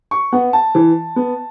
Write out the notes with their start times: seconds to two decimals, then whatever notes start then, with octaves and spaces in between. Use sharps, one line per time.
0.11 C#6
0.33 B3 F#5
0.53 A5
0.75 E3
1.16 B3